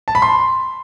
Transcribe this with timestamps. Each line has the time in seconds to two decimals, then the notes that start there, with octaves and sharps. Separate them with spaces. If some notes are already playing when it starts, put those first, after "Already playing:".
0.08 A5
0.15 B5
0.22 C6